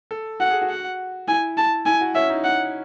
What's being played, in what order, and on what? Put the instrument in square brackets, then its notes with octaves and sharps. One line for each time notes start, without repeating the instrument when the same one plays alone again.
[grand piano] A4
[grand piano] F#4 [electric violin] F#5
[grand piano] G#4
F#4
[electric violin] F#5
[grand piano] E4 [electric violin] G#5
[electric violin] A5
[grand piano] E4 [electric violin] G#5
[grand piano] F#4
[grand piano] C#4 [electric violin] E5
[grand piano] D#4
[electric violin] F#5